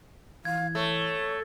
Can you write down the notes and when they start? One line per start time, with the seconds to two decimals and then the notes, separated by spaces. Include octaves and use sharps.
0.45 E3 F5 G#6
0.75 A3 C#5